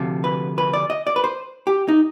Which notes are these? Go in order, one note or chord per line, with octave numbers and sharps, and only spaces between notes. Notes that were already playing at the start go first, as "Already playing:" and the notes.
Already playing: D2 C3 F3
B4
B4
D5
D#5
D5
B4
C5
G4
D#4